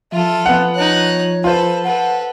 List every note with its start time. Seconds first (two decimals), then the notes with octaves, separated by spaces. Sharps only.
0.12 F3 F4 A4 E5
0.46 F3 B3 F#5
0.75 D#4 C#5 F#6
1.44 F4 A4 B4 C5
1.84 A4 B4 F#5